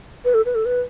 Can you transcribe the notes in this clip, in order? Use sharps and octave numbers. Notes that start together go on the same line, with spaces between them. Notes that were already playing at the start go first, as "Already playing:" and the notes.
B4
A4
B4
A4
B4